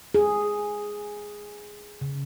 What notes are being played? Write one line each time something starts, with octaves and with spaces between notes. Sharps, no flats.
G#4
C#3